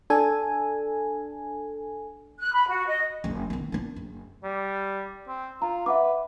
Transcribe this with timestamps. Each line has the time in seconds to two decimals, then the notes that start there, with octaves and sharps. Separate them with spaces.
0.10 D4 A4 G#5
2.39 F#6
2.53 B5
2.68 F#4
2.86 D#5
3.24 F#1 D4
3.50 D#3 B3
3.72 A#3 D4
3.96 F#1
4.43 G3
5.28 C4
5.62 F4 A#5
5.86 B4 E5 F#5 D6